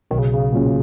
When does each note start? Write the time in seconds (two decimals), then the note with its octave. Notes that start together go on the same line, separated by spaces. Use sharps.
0.11 B1 D#3
0.19 C#3
0.34 C#3
0.52 A#2 F#3 C#4